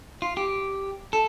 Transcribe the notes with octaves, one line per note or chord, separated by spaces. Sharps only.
F4
G4
A4